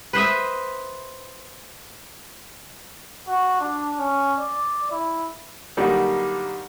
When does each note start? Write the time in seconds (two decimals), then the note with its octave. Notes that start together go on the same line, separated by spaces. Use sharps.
0.13 B4 C5 D#5 E5
3.28 F#4
3.60 D4
3.99 C#4
4.38 D5
4.91 E4
5.77 D3 F#3 G3 A#3 D4 D#4